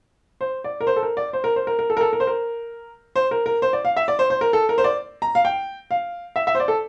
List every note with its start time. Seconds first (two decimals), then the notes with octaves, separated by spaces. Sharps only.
0.41 C5
0.64 D5
0.81 A#4
0.87 C5
0.96 A4
1.03 A#4
1.17 D5
1.33 C5
1.44 A#4
1.56 C5
1.67 A#4
1.79 A#4
1.90 A4
1.97 A#4
2.01 A4
2.13 A#4
2.20 C5
2.27 A#4
3.16 C5
3.31 A#4
3.46 A#4
3.62 C5
3.73 D5
3.85 F5
3.97 E5
4.08 D5
4.19 C5
4.30 C5
4.41 A#4
4.53 A4
4.69 A#4
4.78 C5
4.84 D5
5.22 A#5
5.35 F5
5.45 G5
5.91 F5
6.36 E5
6.47 E5
6.55 C5
6.60 D5
6.68 A4